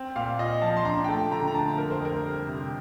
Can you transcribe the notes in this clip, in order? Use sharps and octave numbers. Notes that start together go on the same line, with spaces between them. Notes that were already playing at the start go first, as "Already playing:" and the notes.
Already playing: C4
A#2 F5
F4 D#5
F3 A5
C6
D4 A#5
G5
A3 A5
D3 A#5
A#5
D3 A5
F2 A#4
C5
F2
A#4
G3
C3